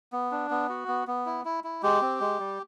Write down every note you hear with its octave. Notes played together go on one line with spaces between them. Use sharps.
B3
D4
B3
F#4
B3
B3
E4
E4
E4
G#3 G4
C4
G#3
G3